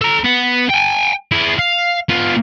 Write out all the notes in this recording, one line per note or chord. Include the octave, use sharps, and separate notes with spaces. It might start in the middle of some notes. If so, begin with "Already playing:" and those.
A4 A#5
B3 F#5
G5 G#5
E4 G#4
F5
B3 F4